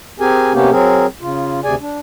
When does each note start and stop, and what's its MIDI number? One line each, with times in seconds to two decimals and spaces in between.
0.20 0.53 60
0.20 0.53 67
0.20 0.53 68
0.20 0.53 70
0.20 0.53 80
0.53 0.71 48
0.53 0.71 58
0.53 0.71 59
0.53 0.71 61
0.53 0.71 67
0.71 1.06 54
0.71 1.06 60
0.71 1.06 68
0.71 1.06 70
1.21 1.60 49
1.21 1.60 65
1.64 1.75 38
1.64 1.75 48
1.64 1.75 68
1.64 1.75 74
1.64 1.75 80
1.81 2.00 62